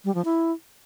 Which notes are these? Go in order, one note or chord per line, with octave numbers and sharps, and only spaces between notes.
G3
F3
E4